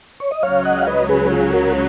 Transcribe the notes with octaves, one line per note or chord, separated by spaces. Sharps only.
C#5
D#5
C#2 C#3 F#3 C#5 F5
D#5 F#5
F5
B4 D#5
G#4 B4
F4 G#4
F#4 A#4